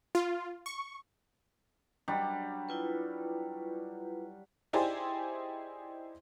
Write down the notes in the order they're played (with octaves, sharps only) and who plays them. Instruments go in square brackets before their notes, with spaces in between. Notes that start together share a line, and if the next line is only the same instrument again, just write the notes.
[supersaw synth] F4
C#6
[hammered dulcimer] F#3 G3 D4
[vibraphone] E4 F4 B4
[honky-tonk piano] D#4 E4 G4 G#4 C5 D5